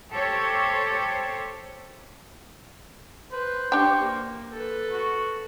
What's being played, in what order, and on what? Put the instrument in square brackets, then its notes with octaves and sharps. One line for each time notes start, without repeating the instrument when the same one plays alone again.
[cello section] G4 A4 C5 C#5
[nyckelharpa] B4 [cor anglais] C5
[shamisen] D4 G5 [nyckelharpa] G4 C#6
[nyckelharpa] A#3
A4 B4
[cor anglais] F#4